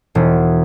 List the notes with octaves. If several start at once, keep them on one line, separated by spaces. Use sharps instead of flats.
E1